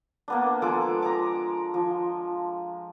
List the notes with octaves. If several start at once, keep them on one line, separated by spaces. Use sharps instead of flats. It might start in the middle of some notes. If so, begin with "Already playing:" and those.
A#3 B3 D4
F3 G#3 A4 D6
A#5 D6
F3